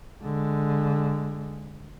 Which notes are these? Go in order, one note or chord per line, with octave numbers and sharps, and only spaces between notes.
D3 G#3